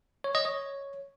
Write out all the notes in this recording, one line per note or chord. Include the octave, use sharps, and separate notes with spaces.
C#5
D#5
C#5